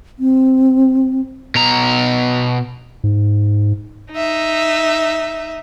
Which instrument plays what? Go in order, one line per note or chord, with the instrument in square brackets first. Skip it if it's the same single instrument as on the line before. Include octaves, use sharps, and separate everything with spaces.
[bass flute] C4
[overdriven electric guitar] B2 A#5
[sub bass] G#2
[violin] D#4 E5